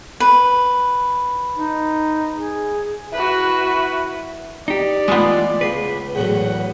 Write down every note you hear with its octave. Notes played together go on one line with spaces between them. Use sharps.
B4
D#4
G#4
E4 F#4 B4
D#4 G4 D5
E3 G#3 A3 B3 F4
C#2 B4 C6
E2 A2 F#3 F#5